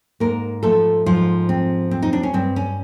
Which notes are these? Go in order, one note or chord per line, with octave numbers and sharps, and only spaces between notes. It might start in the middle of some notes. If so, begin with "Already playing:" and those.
G#2 A#3 A#4
F3 A3 A4
G#2 F3 F4
C4
C4
D#4
D4
C#4
G2 C4
C#4